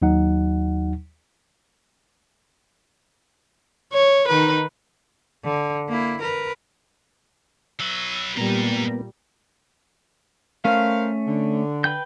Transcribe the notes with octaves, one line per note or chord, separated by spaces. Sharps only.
D#2 F#3 D#4 F#5
C#5
D#3 D#4 B4
D3
A#3 E4
A#4 B4
F#3 B4 E6
A#2 G3 G#3 A#3 B3 A#5
A3 C#4 A#4 C5 F5
D3
B4 G5 G6